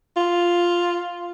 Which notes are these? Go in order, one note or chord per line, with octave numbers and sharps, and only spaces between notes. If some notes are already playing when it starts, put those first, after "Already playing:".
F4